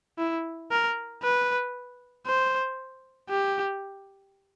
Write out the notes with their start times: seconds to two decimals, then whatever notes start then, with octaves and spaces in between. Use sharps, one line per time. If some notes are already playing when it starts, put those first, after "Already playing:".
0.19 E4
0.71 A#4
1.23 B4
2.26 C5
3.30 G4